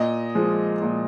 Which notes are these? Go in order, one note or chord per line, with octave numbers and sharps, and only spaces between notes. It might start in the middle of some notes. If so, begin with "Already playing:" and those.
Already playing: A#2 D#5
F3 G#3
A#2